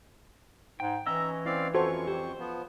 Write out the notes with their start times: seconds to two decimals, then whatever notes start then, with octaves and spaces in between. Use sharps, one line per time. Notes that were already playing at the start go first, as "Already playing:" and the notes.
0.80 G#2 G5
1.07 E3 C#4 D#5 E5 A#5 E6
1.46 C4 E4 D5 F5
1.74 F2 C#4 F4 F#4 A4 C5 C#5 C#6
2.08 G4 C5
2.39 F3 B3